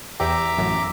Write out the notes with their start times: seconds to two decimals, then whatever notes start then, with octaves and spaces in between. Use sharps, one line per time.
0.20 E2 G4 E5 A#5 D6
0.57 A1 F#2